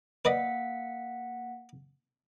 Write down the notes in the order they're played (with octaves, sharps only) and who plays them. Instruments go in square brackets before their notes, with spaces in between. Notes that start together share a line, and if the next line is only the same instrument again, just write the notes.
[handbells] A#3 F#5 B6 [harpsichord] B4 D5 D#5